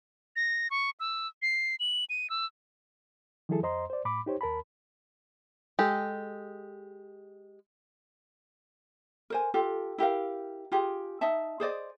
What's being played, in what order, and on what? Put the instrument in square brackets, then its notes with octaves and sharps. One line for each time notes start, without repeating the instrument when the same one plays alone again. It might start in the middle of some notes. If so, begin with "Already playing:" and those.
[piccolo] A#6
C#6
E6
C7
F#7
D#7
E6
[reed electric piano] D#3 F3 G3 E4 G#4 A4
F2 C5 D#5 A#5 C6
C5 D5
A2 B5 D6
D#4 G4 C5 C#5
D#2 A#4 A5 B5
[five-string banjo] G#3 G4 A4
[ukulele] A#4 C5 G#5
F4 G4 A4
E4 G4 A#4 F5
F4 G4 G#4
D#4 D#5 E5 A5
G#4 C5 D5 D#5